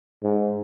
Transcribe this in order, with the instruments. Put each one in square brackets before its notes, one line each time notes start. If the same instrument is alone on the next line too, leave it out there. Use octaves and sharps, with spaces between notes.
[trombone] G#2